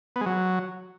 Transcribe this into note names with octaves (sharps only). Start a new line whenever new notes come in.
B3
G#3
F#3